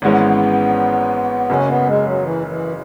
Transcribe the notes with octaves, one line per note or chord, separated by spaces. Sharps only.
G#1 G#2 E3 G#3 B3 C#4
F#1 F#2 C#3 C#4
B3
G#3
F#3
E3
E3